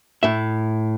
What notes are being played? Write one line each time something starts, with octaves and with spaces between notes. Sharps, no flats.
A2 E5